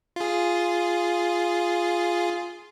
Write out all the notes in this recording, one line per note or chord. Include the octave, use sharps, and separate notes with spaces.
F4 G#4